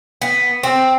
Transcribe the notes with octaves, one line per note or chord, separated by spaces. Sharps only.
B3
C4